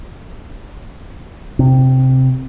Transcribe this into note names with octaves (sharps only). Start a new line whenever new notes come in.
C3